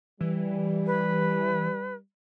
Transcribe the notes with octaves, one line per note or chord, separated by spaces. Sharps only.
E3 G3
B4